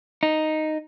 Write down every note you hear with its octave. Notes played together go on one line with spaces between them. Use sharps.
D#4